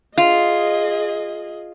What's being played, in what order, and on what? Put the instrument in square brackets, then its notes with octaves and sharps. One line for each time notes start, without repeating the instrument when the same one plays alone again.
[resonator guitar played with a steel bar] F4 [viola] G#4 D#5